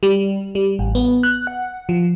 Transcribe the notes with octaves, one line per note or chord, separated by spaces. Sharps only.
G3
G3
A1
B3
F#6
F#5
F3